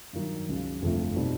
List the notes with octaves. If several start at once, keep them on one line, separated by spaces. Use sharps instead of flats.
G2 D#3 F#3
C#2 C#3 F#3
G1 F2 C3 F3 A3
B2 G3 C4 D#4